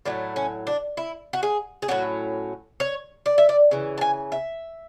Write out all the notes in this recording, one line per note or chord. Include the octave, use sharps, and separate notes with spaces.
A2 F#3 A3 D4
C#4
D4
E4
F#4
G#4
G#4
A2 F#3 C#4 F#4
C#5
D5
E5
D5
C#3 E3
A5
G#5
E5